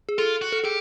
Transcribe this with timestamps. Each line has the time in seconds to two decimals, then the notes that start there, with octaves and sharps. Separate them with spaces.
0.09 G#4
0.18 F4 A4
0.42 F#4
0.52 A4
0.64 G4 G#4